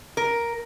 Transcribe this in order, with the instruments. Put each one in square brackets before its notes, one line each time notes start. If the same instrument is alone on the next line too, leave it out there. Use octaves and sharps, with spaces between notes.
[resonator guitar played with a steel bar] A#4